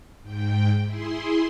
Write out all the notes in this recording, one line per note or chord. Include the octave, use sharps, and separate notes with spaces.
G#2 G5
E4 G#4 C6